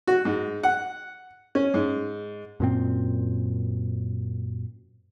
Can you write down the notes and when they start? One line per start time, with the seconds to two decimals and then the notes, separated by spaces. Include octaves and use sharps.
0.07 F#4
0.25 G#2
0.63 F#5
1.55 C#4
1.74 G#2
2.60 F#2 A#2 C4